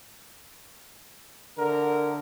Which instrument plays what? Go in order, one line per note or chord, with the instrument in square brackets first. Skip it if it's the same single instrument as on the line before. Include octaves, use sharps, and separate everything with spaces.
[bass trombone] D3 [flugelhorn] A#4